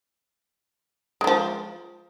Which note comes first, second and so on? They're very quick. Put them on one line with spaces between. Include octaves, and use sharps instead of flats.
G#3 A3 F3